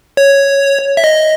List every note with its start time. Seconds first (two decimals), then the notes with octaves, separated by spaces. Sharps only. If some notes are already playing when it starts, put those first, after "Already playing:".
0.17 C#5
0.97 E5
1.04 D#5